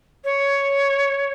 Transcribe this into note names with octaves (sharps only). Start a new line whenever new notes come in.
C#5